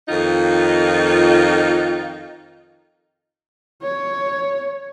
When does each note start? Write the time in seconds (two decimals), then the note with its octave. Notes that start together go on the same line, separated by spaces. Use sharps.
0.08 F2 D#3 D#4 F4
3.82 C#5